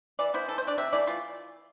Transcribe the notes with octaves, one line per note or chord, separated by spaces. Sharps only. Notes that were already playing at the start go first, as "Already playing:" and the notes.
E3 D5
B3 E4 C5
E3 A4
C5
A3
D4 D5
C3 E5
E3 A3 E4 D5
E3 F4